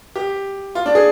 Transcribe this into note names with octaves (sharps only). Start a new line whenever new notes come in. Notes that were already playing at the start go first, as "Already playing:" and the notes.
G4
F4
D4
G#4